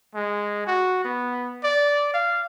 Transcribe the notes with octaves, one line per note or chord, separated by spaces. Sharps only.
G#3
F#4
B3
D5
F5